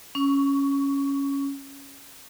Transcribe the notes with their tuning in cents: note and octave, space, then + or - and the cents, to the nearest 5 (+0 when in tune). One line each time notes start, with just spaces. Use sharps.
C#4 +0 C#6 +20